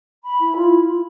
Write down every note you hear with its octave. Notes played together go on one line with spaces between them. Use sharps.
B5
E4
F4